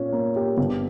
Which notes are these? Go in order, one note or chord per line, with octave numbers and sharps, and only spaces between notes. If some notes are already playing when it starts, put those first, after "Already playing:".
Already playing: A#2 C#4
A#3
G4
G1